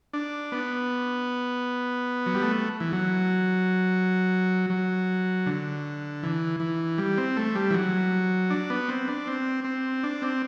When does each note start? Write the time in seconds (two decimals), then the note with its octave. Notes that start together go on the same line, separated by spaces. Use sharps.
0.13 D4
0.52 B3
2.26 F#3
2.34 G3
2.42 A3
2.80 E3
2.92 F#3
4.70 F#3
5.46 D3
6.23 E3
6.60 E3
6.98 G3
7.17 C4
7.36 A3
7.55 G3
7.70 E3
7.74 F#3
8.50 D4
8.70 B3
8.89 C4
9.08 D4
9.27 C4
9.64 C4
10.03 D4
10.22 C4